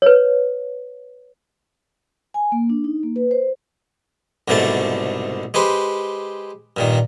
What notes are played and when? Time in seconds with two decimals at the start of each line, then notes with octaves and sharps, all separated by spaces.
0.02 B4 C#5
2.34 G#5
2.52 A#3
2.70 D4
2.84 D#4
3.03 A#3
3.16 B4
3.31 C5
4.48 C2 G#2 B2 D3 A3 A5
5.54 G#3 G4 B4 C5
6.77 G2 A#2 D#3